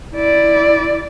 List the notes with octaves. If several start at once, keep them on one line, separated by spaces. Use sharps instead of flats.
E4 D5